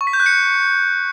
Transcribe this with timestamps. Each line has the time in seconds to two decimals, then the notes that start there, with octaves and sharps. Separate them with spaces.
0.01 C#6
0.07 B6
0.13 G6
0.20 F#6
0.26 C#7